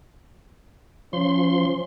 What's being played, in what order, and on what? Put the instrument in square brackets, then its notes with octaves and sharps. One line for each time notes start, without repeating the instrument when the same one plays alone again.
[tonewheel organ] F3 C6 [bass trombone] C#4